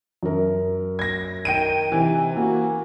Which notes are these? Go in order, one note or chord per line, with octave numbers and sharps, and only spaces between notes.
F#2 A#4
G#6 A#6
D#3 G5 D7 D#7
C3 E3
A#3 F#4